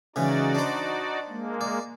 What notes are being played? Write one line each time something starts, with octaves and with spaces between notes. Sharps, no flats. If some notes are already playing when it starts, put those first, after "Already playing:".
C#3 E3 G#3 D#4 F#4 D5
D4 C5
G#3 A#3
D5